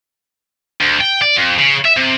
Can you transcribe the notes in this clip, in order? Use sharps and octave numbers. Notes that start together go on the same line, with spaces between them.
D2
G5
D5
F2
C#3
E5
C3